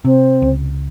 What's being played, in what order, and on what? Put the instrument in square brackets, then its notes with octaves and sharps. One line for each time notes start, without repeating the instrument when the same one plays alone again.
[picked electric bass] C3 [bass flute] C4
[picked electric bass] C#2